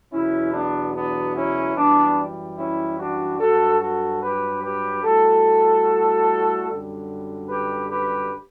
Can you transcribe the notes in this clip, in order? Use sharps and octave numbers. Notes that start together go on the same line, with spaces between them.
E2 B2 F#3 C#4 E4
B3 D4
B3 D4
C#4 E4
F#2 E3 G3 B3 D4
C#4 E4
D4 F#4
G2 F#3 F#4 A4
F#4 A4
G4 B4
G4 B4
A2 G3 F#4 A4
F#2 D3 G3
G4 B4
G4 B4